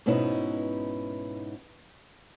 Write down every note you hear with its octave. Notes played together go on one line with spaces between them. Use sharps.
G#2 B2 B3 C#4 D#4 E4